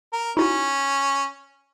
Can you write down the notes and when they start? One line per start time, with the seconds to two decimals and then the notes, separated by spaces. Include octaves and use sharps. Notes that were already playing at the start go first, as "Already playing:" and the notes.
0.13 A#4
0.37 C#4 D#4 E4 F#4